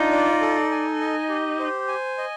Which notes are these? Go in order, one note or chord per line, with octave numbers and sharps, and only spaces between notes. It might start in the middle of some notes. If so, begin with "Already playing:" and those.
Already playing: D4 D#4 F4
D5
A4
G#5
D#5
G4
C5
G#5
D#5